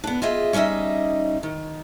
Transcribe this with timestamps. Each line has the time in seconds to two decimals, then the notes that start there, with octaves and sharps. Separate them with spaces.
0.04 B3 D4
0.22 F4 G#4 D#5 E5
0.53 G3 C#4 D#4 D#5 E5
1.43 D#3